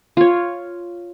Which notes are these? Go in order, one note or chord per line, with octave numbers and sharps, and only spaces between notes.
F4 C#5